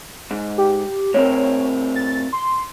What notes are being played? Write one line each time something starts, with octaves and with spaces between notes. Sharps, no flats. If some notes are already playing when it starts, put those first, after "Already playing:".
G#2
G4
A2 C4 A#4 C#5
A6
C6